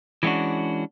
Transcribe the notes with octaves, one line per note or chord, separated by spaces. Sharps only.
E3 G#3 B3 C#4 D4 F#4